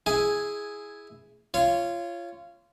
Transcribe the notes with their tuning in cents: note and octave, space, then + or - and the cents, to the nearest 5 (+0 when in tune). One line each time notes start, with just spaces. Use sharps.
E4 +0 G#4 +0 G#5 +0
F4 -20 C#5 +0